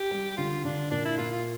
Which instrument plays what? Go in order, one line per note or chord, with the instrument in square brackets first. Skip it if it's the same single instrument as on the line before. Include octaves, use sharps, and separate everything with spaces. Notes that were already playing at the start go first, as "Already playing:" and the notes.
Already playing: [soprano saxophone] G4
[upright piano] G3
[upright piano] D3 [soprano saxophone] F4
[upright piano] D3 [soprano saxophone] D4
[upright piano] A#2 [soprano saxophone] D4
[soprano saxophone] E4
[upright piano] A#2 [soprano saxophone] F4
[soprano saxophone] F4